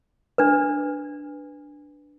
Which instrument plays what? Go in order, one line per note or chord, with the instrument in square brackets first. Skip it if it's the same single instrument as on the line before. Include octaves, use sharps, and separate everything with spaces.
[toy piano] D4 B4